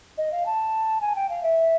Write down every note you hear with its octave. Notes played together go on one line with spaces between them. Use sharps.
D#5
F5
A5
G#5
G5
F5
E5